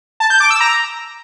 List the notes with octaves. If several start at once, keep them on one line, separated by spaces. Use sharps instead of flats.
A5
G6
D6
E6
A#5